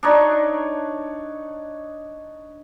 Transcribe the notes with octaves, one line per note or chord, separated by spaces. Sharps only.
D4 D#4 C#5